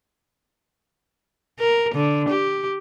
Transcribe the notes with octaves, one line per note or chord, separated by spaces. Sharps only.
A#4
D3
G4